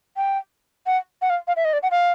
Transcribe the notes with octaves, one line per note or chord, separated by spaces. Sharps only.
G5
F#5
F#5
F5
F5
E5
D#5
D5
F#5
F5